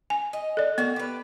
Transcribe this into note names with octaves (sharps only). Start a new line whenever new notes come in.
G#5
D#5
A4 D5
A#3 B3 F#4
G4 B4